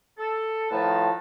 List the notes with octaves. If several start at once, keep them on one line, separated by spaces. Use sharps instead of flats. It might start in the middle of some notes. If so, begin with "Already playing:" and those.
A4
A2 D#3 F3 B4 A5